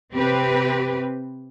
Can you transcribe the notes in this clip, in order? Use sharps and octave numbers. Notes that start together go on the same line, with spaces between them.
C3 C4 G4 B4